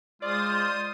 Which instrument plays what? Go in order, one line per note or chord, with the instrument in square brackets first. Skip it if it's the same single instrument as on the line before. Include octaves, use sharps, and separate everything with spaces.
[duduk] G#3 [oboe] F4 [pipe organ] C5 D#6 [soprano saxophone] D5